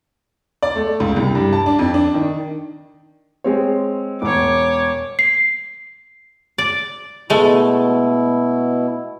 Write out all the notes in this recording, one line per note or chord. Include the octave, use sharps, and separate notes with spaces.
D5
A3
C#2
C2
G2
A5
D4
F2
D4
D#3
G#3 C4 C#5
E1 C#5 D6
C7
D5
B2 G#3 A3 E4